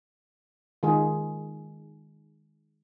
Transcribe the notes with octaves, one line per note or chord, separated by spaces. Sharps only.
D#3 G#3 F4 G#4